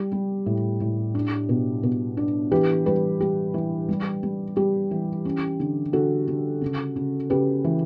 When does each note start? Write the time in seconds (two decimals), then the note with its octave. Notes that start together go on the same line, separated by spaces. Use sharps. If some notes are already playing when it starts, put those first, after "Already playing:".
Already playing: G3 G4
0.12 G3
0.46 A2
0.81 A2
1.15 D4
1.49 B2
1.83 B2
2.17 D4
2.51 E3 G4 B4
2.86 G3 G4 B4
3.20 G3 G4
3.54 E3
3.89 G3
4.23 G3
4.57 G3 G4
4.91 E3
5.25 C#4
5.60 D3
5.93 D3 F#4 A4
6.28 D3
6.62 C#3
6.96 C#3
7.30 C#3 G4 B4
7.64 E3